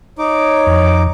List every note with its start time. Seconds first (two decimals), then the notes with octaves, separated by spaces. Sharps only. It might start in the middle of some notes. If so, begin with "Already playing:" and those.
0.19 D#4 C#5 D6
0.67 F2